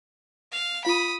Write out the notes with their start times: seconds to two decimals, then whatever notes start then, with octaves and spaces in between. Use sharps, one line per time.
0.52 F5
0.85 F4 F5 B5 D#6